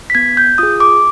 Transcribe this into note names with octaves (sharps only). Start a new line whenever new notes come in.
B6
B3 G#6
G6
F4 G#4 D#6
D6